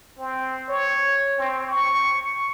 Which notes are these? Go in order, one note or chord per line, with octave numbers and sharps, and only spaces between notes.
C4
C#5
C4
C#6